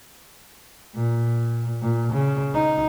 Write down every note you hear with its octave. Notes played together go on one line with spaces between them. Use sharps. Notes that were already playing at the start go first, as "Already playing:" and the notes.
A#2
A#2
C#3
D#4